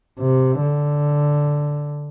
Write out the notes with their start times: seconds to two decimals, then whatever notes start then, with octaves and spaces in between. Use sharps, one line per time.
0.19 C3
0.61 D3